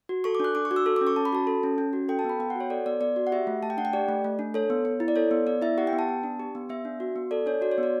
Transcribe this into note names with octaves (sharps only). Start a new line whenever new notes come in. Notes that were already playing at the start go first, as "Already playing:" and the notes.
F#4
A4 C#6
D6
D4 F#6
D4 D6
C#6
F#4
E6
A4
D6
C#4
C#6
C#4 A5
B5
F#4 A5
A4
C#4
C#4
F#4
A4 G5
A5
B3 B5
B3 G5
F#5
F#4
C#5
A4 D5
B3 D5
B3 D5
F#4
F#5
G4 E5
A3
A3 A5
G5
D4 F#5
G5
G4 D5
A3
A3
D4
A4 C#5
B3
B3
E4
D5
A4 C#5
B3
B3 D5
E4 E5
G4 F#5
G5
B3
A5
B3
D4
G4
B3
B3 E5
D4
F#4
B3
A4 D5
D4 C#5
F#4 D5
C#5
B3
D5